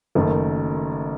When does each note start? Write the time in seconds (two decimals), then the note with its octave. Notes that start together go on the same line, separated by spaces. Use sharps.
0.15 F#1 F#2 D#3 A3